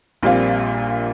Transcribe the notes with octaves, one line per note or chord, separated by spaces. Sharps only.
A#1 A#2 G3 C4 F4